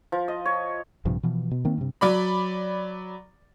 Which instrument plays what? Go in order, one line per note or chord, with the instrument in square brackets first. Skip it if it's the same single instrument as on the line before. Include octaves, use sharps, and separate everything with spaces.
[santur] F3
D#5
C#5
[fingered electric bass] A#1 G2 C3 F3
B2 E3 F3
B2
D#3 A#3 C4
G2 C3
[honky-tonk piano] F#3 D5 B5